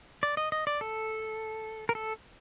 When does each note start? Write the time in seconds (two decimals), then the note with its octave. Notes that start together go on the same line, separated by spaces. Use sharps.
0.23 D5
0.37 D#5
0.52 D#5
0.67 D5
0.81 A4
1.89 A#4
1.95 A4